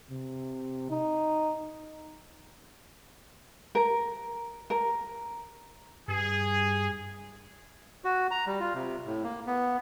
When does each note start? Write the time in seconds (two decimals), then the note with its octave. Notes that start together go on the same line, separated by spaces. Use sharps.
0.11 C3
0.90 D#4
3.75 A#4
4.70 A#4
6.08 G2 G#4
8.04 F#4
8.31 A#5
8.46 G3
8.60 F4
8.74 C3
9.05 A2
9.24 A#3
9.47 B3